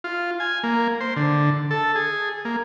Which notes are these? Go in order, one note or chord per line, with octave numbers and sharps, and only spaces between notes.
F4
G#5
A#3
C5
D3
A4
G#4
A#3